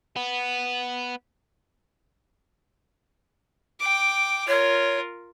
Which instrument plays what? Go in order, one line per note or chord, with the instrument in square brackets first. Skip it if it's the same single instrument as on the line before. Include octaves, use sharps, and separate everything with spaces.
[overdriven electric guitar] B3
[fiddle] G5 D6
[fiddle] F4 A#4 [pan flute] C#5